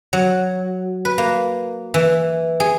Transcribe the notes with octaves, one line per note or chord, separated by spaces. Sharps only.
F#3
B4
A#3
E3
G#4